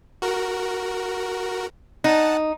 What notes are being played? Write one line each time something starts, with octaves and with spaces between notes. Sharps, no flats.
F#4 A#4
D#4 F#5 A5